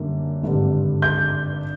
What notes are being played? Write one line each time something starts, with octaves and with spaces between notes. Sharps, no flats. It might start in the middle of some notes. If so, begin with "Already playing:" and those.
Already playing: F#2 D3 G3 A#3
G#1 G2 D3 G3
G6